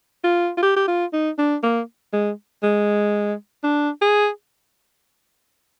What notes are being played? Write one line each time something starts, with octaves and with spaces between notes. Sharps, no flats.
F4
F4
G4
G4
F4
D#4
D4
A#3
G#3
G#3
D4
G#4